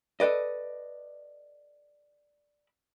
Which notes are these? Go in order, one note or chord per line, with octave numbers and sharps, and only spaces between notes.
A4 B4 D5 D#5